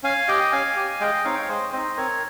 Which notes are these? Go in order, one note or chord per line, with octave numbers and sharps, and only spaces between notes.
C#4 F5 G#5
G4 D#5 G5
C#4 F5 G#5
G4
G#3 D#5 G5
C4 D#4 C#5 F5
G5
F5
G#3 C5 D#5
C4 D#4 C5 D#5
C4 A#4 C#5